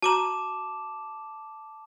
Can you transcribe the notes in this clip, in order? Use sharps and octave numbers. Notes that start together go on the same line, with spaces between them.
F#4 A5 A#5 D6 E7